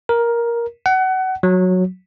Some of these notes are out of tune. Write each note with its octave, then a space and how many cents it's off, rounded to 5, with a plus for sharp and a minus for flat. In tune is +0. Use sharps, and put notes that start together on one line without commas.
A#4 +10
F#5 +25
F#3 -10